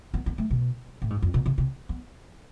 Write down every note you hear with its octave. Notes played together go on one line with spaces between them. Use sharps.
B3
B3
A3
B2
A2
G#2
F2
B2
C3
C3
B3